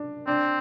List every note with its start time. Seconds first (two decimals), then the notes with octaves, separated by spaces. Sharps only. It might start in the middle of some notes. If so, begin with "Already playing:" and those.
Already playing: D4
0.27 C4 D4